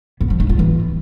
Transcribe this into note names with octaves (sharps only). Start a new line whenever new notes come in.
B3
F3
D#4
F4
E3